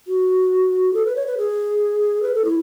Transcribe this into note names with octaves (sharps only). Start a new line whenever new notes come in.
F#4
A4
B4
C#5
B4
G#4
B4
A4
E4